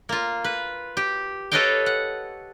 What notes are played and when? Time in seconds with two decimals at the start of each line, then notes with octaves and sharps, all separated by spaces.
0.09 A#3 F4
0.44 B4
0.97 G4
1.52 A4 B4 C#5 D#5 F5 G5
1.86 F#5